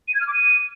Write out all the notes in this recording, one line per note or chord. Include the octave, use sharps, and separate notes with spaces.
D#7
G#6
F6
D6
D#7